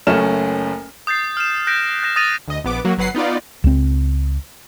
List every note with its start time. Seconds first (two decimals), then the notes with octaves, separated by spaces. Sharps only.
0.07 F#1 F#2 A3 C#4 F6 E7
1.07 D#6 G6 A6 C7
1.37 F6 E7
1.67 F#6 G6 A#6 B6 D7
2.03 F#6 G6 A#6 E7
2.16 D#6 A6 A#6 D#7 F7
2.48 D2 D#5
2.64 A#1 B3 D6
2.85 F#3 A#3 F#4
2.97 G1 F#3 B4 F#5 C7
3.15 B3 D#4 F4 D5
3.64 C#2 C4